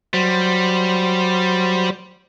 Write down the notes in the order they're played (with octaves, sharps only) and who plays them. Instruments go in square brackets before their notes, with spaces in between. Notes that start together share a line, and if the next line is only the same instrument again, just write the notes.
[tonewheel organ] F#3 C5 [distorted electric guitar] G3